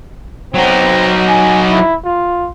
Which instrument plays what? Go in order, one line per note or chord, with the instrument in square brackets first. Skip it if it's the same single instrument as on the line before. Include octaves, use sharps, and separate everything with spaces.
[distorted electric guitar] F#3 D#4 [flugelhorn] C4
[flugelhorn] G#5
E4
F4